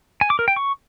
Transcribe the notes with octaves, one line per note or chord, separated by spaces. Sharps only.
G#5
D6
A#4
G5
C#6